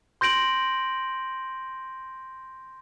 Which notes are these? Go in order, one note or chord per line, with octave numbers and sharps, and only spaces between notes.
C6 G6 A#6 D7 F#7